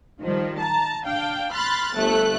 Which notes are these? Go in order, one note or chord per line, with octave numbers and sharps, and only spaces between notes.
D#3 F3 G3
A5 A#5
D4 F5 G5
B5 C6 F6 F#6 A6
G1 A3 A4 F#6